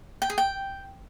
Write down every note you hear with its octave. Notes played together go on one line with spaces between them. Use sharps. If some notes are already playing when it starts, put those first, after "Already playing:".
G5
G#4
G5